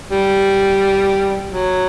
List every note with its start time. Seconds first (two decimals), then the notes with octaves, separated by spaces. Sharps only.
0.11 G3
1.51 F#3